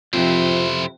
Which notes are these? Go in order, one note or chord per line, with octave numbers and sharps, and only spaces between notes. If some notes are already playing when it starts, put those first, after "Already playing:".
F2 A2 C3 F3 E4 C5